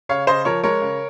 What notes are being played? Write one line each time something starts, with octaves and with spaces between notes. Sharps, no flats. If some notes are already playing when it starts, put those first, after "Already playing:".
C#3 C#5 F5
C#3 C5 D#5
F3 A#4 C#5
G#3 A#4 C#5
C#3